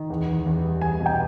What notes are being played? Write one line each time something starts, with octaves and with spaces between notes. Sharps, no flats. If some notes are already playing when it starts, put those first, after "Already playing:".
Already playing: D#3
E2
E2
E2
G3
E2 G#5
B2
G5